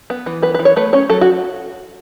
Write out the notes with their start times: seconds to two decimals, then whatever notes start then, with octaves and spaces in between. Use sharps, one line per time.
0.10 B3
0.26 E3
0.42 B3 B4
0.55 B4
0.59 E3
0.65 C#5
0.76 A3 B4
0.93 C#4 C#5
1.10 F#3 A4
1.21 F#4